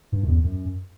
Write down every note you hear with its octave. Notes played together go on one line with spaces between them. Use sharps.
G2
F#2
E2
F#2